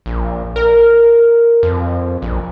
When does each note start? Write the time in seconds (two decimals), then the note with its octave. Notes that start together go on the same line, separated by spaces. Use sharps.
0.06 A#1
0.56 A#4
1.63 F2
2.22 A#1